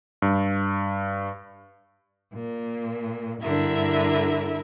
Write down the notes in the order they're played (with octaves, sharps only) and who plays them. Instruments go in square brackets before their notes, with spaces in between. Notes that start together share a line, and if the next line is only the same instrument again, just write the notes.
[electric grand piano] G2
[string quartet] A#2
G2 D3 E4 A#4 E5